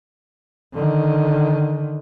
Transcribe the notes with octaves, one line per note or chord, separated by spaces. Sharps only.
D3 D#3